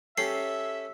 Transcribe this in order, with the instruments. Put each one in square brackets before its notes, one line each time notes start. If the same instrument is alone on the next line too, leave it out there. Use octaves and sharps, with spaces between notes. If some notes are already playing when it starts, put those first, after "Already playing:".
[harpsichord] C#4 G4 A4 [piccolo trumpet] E5 [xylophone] C7